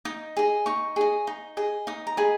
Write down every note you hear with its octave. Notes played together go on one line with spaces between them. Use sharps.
D#4 D#6
G#4 D#5
D#4 C#6
G#4 D#5
D#4
G#4 D#5
D#4 D#6
A#5
G#4 D#5 B5